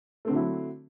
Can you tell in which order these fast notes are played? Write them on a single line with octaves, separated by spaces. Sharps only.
A3 C4 D3 F#3 E4